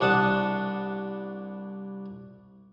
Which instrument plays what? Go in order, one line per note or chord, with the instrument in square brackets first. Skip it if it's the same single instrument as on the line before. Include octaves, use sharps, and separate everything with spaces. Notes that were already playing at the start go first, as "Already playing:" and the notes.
[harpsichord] C2 D4 F#5 A5 D#6